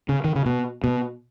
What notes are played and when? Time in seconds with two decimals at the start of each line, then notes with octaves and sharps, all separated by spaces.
0.09 C#3
0.24 D#3
0.36 C#3
0.46 B2
0.84 B2